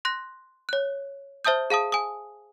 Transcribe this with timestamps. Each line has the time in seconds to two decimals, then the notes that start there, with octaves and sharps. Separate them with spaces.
0.05 C6 F#6 A#6
0.69 C#5 F#6
1.45 C5 E5 A5 D#6 G6
1.70 G#4 F5 A5 D#6
1.92 G#5 D#6